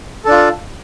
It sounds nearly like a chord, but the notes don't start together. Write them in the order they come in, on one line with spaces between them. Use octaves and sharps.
A4 D4 F4